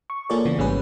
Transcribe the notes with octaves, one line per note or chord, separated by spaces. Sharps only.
C#6
A#3 F4 G#4 A4 C#5 D5
C#3 E3 B3
A1 G#2 G3 C#4 G#4 B4